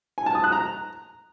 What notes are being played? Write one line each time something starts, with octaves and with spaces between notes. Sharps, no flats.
G#5
A5
D#6
F#6
A#5